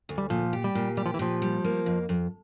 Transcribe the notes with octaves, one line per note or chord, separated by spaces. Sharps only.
D2
G3
A#2 F3
G4
G3
A#2
G3 G4
F3
E3
A#2 F3
G3
A#3
F2
F2